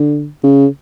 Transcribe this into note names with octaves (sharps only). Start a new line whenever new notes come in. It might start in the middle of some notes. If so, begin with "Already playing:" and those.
Already playing: D3
C#3